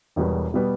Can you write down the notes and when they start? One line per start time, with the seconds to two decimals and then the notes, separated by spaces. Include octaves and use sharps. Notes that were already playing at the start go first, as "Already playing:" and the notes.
0.16 E1 E2 B2 G3 B3
0.54 B2 G3 B3